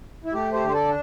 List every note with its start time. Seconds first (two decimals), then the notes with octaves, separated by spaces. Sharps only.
0.24 E4
0.33 A3 G4
0.53 G4 C5
0.60 D3
0.68 C5
0.73 A4 D5
0.87 D4